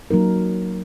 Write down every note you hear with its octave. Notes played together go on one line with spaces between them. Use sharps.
F#3 A#3 D#4 A#4